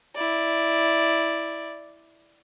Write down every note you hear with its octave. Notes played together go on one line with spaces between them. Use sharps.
E4 D5